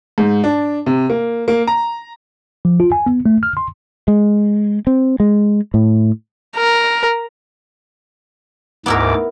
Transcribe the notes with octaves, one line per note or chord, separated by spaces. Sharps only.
G#2
D4
C3
A#3
A#3
A#5
F3
F4
G#5
B3
A3
F6
C6
G#3
C4
G#3
A2
A#4
D2 G#2 B3 E4 A#4 D6